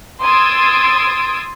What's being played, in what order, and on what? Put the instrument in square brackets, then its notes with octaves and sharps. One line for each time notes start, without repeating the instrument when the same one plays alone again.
[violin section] C6 D#6 E6 G#6 A6 D7